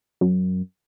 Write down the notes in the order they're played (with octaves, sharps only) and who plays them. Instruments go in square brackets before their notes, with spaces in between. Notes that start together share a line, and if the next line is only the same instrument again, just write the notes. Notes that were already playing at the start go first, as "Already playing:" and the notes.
[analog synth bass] F#2